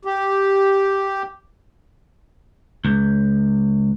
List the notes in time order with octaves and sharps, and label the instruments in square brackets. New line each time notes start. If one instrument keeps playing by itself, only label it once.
[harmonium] G4
[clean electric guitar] C#2